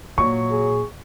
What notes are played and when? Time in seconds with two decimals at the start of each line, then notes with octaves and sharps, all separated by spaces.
0.18 A#2 F#3 C#6
0.51 G#4